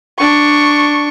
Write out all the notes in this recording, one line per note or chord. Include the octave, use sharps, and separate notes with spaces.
D4 C#6